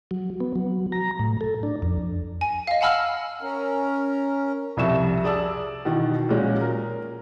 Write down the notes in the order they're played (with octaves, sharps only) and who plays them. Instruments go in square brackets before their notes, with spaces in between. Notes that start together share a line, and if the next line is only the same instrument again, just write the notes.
[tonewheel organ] F#3
B3
F#3
A#5
A2
A4
D4
F2
[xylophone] G#5
D#5 F5
F#5 G#5 A5 B5 E6 F6
[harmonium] C#4 A#4
[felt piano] C2 F2 C3 E5 C#6 E7
G#4 D5 A5 E6
B2 D#3 E3
A#2 F#3 G#3 C#4
A#4